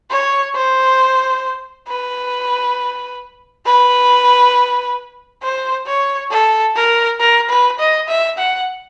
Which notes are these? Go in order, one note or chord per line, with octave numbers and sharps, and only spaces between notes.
C#5
C5
B4
B4
C5
C#5
A4
A#4
A#4
B4
D#5
E5
F#5